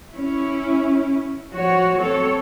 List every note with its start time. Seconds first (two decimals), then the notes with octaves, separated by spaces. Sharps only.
0.12 C#4 E4
1.51 F3 F#4 C#5
2.00 C4 A4 C#5